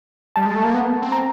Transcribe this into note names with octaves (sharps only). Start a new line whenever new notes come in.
G3 A5
G#3
A3
A#3
B3
C4
A#5